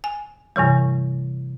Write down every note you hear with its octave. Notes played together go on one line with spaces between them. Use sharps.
G#5
G2 C3 E3 G3